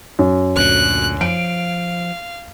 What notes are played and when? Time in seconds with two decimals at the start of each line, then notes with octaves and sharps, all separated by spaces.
0.19 F#2
0.56 D2 A#2 F#6
1.21 F3 F5 D7